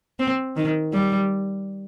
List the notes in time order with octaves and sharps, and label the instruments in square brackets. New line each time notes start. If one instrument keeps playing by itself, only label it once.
[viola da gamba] C4
D#3
G3